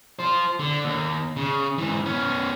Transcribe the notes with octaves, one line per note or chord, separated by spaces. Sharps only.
F4 C5
D3
D#2
C#3
G#2 E3
B3 C#4